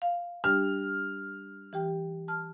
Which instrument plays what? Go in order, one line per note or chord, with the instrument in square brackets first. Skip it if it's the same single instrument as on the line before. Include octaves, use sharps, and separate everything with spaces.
[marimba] F5
[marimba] G3 D4 G4 [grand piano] F6
[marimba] E3 G4 G5
A5 F6